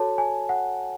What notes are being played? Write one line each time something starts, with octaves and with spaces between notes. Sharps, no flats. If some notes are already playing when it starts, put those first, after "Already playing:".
Already playing: F#4 A4 C#5 A5
G#5
F#5